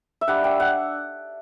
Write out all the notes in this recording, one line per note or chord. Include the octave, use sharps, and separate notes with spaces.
E5
G3 D4 F#5
G5
F#5